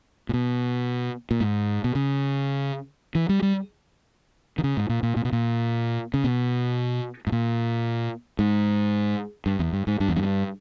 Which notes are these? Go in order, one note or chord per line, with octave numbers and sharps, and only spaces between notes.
A#2
B2
A#2
G#2
B2
C#3
E3
G3
G3
D#3
C#3
G#2
A#2
A#2
A#2
B2
A#2
C#3
B2
G#2
A#2
G#2
G2
E2
G2
G#2
G2
E2
G2